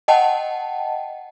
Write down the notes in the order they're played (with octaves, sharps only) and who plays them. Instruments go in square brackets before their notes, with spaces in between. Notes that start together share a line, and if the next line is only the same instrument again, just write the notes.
[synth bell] D#5 F#5 G5 A5